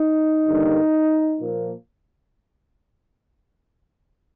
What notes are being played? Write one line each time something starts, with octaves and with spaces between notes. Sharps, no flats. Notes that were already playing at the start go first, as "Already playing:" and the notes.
Already playing: D#4
G2 D3 G3 A#3
A#2 F3 A#3